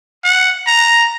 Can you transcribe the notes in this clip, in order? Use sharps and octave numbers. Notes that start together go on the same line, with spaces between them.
F#5
A#5